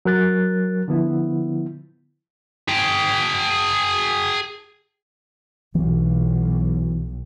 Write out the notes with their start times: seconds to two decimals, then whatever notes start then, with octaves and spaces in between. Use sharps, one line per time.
0.05 F#3 A#4 F#6 A6
0.88 D3 F3 B3 E4
2.68 G#4 G5
5.75 B1 E3